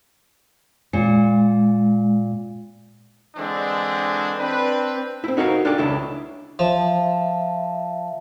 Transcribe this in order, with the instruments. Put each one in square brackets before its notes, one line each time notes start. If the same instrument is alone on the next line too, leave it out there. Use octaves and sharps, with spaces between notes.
[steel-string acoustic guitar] A#2 [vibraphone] G#3
[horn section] D3 E3 G#3 C4 D4
C4 D4 B4
[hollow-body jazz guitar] C4 E4
D#4 F#4 A#4 C#5 D#5 F5
D4 F4 G4 A4 D5
C#2 C#3 D4 E4
[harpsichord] F3 [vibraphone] E5 F5 A5